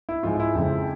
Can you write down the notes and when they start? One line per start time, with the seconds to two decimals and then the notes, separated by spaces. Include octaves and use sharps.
0.09 E4
0.23 G#2 F3 G#3 F4
0.40 E4
0.55 F2 C#3 F3 G#3